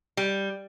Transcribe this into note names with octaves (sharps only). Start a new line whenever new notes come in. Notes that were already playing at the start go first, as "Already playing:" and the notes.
G3